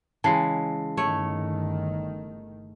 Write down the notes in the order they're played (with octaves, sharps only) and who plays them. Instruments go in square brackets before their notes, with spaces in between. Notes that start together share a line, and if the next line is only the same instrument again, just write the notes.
[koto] C#3 [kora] E3 G#3 [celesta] A5 C7
[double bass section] G1 D#3 [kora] A3 [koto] C#5